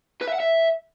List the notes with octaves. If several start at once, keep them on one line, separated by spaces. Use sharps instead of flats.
B4
E5
F#5
E5